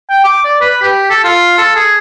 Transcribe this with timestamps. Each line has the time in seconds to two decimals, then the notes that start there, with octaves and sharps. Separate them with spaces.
0.09 G5
0.24 D6
0.44 D5
0.61 B4
0.82 G4
1.10 A4
1.24 F4
1.58 A4
1.75 G#4